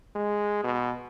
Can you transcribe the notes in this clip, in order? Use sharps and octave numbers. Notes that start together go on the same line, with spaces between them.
G#3
B2